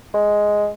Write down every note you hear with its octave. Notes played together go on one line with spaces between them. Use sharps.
G#3